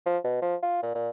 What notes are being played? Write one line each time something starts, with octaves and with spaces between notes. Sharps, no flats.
F3
B2
F3
F4
A#2
A#2